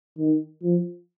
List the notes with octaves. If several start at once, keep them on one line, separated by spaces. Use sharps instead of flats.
D#3
F3